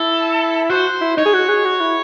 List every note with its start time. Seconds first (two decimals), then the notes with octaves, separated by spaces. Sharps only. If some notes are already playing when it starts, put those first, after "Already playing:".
Already playing: E4 A4
0.70 F#4 C5
1.01 E4
1.17 D#4 C#5
1.26 G#4
1.34 F#4
1.49 G#4
1.65 F#4
1.81 E4